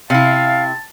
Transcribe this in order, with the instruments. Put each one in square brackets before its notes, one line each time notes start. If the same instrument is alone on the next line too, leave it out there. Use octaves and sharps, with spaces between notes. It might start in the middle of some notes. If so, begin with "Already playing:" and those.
[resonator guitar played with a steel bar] C3 E4 [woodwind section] F5 [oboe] A5